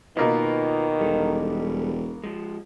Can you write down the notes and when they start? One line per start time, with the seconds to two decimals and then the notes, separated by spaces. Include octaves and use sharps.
0.17 B2 D#3 A#3 D#4 F4 B4
1.00 E1 G3 A4
2.24 F3 G#3